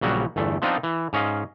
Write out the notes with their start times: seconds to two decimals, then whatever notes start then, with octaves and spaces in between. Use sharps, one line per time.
0.01 A#1 C#3 F#3 G3 F#4
0.36 G1 E2 A3
0.62 F3 B3 C4 D4 D#4 F4
0.83 E3
1.13 G#2 C#4 D#5 F5